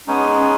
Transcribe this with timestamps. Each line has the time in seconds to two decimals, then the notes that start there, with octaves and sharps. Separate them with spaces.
0.07 G#3 B3 C#4 D#4
0.38 C#4